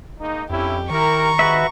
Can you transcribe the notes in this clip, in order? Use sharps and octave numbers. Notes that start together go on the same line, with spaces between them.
G#3 A#3 D#4
F2 C#4 D4 E4 G4
D#3 E4 G4 A#4 A#5 C#6
F2 G#2 G#3 F#4 B4 E5